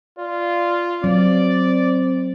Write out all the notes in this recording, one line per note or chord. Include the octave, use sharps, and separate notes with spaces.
F4 D5
F#3 C4 D5